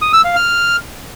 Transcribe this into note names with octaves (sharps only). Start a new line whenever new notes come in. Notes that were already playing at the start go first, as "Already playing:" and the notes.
D#6
E6
F5
F6